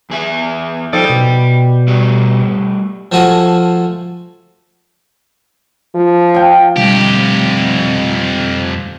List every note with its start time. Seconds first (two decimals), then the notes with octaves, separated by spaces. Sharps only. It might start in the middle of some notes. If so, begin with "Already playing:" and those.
0.10 E2 G#4 E5
0.93 F3 D#4 A4 D5 G5
1.09 B2
1.87 G3 A3 F#4
3.12 F3 A3 F#4 G#5
5.95 F3
6.34 F5 G5 A5
6.77 F2 B2 D3 G3 G4